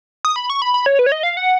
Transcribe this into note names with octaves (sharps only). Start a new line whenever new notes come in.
D#6
B5
C#6
B5
B5
C#5
B4
C#5
D#5
F5
F#5